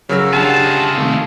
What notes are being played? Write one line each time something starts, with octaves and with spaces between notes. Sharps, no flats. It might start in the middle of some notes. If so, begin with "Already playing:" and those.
C#3 F#3 A#4 E6
D4 F4 G4 G#4 F#5 A5
C3 D#3 A3